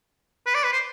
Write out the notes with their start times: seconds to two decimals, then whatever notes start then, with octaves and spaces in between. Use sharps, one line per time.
0.46 B4
0.55 D5
0.64 B4
0.72 C5